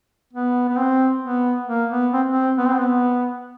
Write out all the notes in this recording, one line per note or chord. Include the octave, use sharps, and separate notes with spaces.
B3
B3
C4
B3
A#3
B3
C4
C4
B3
C4
B3